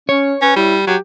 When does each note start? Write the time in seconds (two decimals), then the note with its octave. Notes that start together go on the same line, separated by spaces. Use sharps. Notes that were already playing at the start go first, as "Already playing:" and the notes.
0.09 C#4 C#5
0.42 C#4 B4
0.56 G3 E4
0.87 F#3 G4